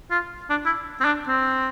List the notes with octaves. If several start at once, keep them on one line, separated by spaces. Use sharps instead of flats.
F4
D4
E4
C4
D4
C4